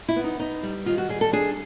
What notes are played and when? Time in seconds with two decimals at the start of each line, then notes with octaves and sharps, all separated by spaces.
0.08 E4
0.16 B3
0.24 D#4
0.39 B3 D#4
0.63 G3
0.86 D#3 F4
0.98 F#4
1.09 G3 G#4
1.21 A4
1.33 D4 G#4